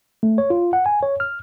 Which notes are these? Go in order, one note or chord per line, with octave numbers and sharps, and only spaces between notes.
A3
C#5
F4
F#5
G#5
C#5
F6